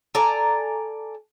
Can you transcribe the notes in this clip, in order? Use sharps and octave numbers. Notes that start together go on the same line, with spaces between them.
A4 D5 G#5 A#5